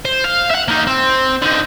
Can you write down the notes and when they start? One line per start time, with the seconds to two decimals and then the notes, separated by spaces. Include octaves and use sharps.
0.05 C5
0.24 F5
0.50 E5 F#5
0.68 A#3 D#4
0.87 C4
1.42 D3 D#4